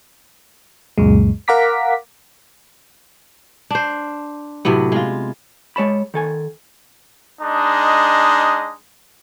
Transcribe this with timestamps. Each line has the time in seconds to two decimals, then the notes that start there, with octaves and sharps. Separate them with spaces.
0.98 C#2 F#2 A#2 G#3
1.48 A#4 F5 F#5 A#5 D6 B6
3.71 D4 C5
4.65 A2 C3 F#3 B3
4.92 G#3 F4
5.76 G#3 C#5 A5 B5
6.14 D#3 A4 G#5
7.41 G#3 D4 D#4 D#5